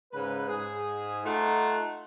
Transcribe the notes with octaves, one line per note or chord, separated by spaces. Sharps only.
G#2 C#3 B4
G#2 G#4
A3 D#4 F4 F#5 A5